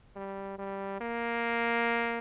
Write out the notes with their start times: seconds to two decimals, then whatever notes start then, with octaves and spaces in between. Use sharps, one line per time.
0.16 G3
0.58 G3
1.01 A#3